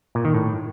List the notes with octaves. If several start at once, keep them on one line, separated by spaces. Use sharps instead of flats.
A#2
D#3
A2